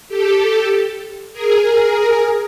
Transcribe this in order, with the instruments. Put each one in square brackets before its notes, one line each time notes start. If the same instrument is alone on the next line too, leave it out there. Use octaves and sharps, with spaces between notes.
[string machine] G4 A4
G#4 A#4
G#4 A#4